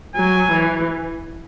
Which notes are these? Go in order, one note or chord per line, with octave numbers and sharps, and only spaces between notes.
F#3 G#5
E3